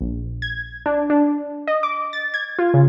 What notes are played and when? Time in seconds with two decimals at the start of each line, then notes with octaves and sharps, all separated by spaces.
0.01 A#1
0.42 G#6
0.86 D4
1.10 D4
1.67 D#5
1.83 D6
2.13 A6
2.34 G#6
2.59 F4
2.74 C#3